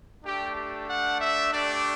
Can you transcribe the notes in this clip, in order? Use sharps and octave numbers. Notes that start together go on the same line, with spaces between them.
A3 D4 G4
G4
F#5
E5
A3 D4 G4 D5